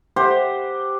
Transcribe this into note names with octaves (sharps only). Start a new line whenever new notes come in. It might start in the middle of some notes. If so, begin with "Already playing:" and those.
G4 C5 F#5